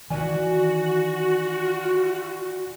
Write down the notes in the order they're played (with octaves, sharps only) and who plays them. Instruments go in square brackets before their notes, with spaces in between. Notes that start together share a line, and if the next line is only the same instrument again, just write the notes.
[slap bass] D#3 E3 [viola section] F#4 [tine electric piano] D5 G#5